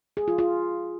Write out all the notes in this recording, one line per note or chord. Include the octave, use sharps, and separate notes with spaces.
G#4
F4
F4